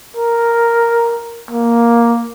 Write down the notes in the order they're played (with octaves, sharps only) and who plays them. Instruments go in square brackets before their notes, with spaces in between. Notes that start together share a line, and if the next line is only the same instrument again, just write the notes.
[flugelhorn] A#4
A#3